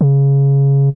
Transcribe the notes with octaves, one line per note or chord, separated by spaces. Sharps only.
C#3